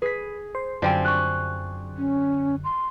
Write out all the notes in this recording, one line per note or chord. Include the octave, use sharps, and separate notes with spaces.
G#4 B4 B6
C5
F#2 D3 F3 G3 C4 D5 F5 G#5
C#6 F#6
C#4
C6